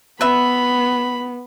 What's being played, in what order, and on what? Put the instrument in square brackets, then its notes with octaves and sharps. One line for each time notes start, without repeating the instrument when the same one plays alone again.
[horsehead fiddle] B3 [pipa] B4 E5 [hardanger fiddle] B5